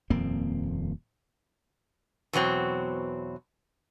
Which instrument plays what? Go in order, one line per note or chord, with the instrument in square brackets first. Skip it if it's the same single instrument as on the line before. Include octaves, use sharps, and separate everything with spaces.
[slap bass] D#1 F2 A#3 C4
[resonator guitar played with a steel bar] E2 B2 F#3 C4